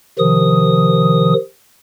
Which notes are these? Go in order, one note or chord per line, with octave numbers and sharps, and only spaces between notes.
C3 D#3 F3 D#6